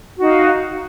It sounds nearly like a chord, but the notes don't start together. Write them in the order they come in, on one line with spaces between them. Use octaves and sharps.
F#4 D#4 F5